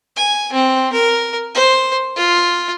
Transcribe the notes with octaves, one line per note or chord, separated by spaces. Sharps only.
G#5
C4
A#4
C5
F4